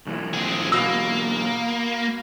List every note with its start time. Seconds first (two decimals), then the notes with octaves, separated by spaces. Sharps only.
0.06 B1 E3
0.34 C4 G#4
0.72 B2 A#3 E6